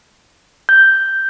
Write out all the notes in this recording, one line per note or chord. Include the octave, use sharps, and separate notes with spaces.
G6